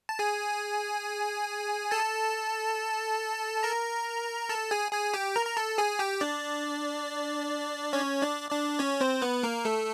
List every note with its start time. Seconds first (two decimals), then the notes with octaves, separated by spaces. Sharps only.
0.09 A5
0.19 G#4 G#5
1.91 A4 A5
3.63 A#4 A#5
4.49 A4 A5
4.71 G#4 G#5
4.92 G#4 G#5
5.14 G4 G5
5.36 A#4 A#5
5.46 A#5
5.57 A4 A5
5.78 G#4 G#5
5.99 G4 G5
6.21 D4 D5
7.93 C#4 C#5
8.22 D4 D5
8.51 D4 D5
8.79 C#4 C#5
9.01 C4 C5
9.22 B3 B4
9.43 A#3 A#4
9.65 A3 A4